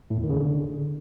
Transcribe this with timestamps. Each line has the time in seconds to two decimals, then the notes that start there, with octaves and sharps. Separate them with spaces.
0.10 A2
0.17 E2
0.23 D#3
0.30 C#3
0.36 D3